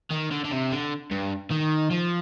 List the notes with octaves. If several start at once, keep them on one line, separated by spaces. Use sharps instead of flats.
D#3
D3
D3
C3
D3
G2
D#3
F3